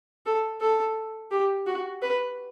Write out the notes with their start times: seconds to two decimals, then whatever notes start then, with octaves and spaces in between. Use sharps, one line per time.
0.26 A4
0.61 A4
1.31 G4
1.67 F#4
2.02 B4